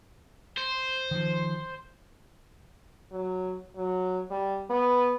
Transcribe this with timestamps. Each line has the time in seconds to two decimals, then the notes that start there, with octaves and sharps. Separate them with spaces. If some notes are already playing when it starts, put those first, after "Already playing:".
0.58 C5
1.11 D#3 F3
3.12 F#3
3.76 F#3
4.30 G3
4.70 B3